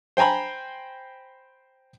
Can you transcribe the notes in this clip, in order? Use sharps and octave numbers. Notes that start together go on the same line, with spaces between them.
C5 G5 G#5 A#5 B5